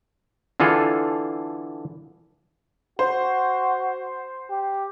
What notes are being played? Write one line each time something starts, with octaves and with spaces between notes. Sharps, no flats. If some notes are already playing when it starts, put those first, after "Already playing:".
D3 E3 F4 G#4 A4
F#4 C5
G4